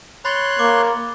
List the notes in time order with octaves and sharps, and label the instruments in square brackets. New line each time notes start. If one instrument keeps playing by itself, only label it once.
[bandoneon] C#5 C6 F#6 [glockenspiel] B5 A6 G7
[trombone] A#3 [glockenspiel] D6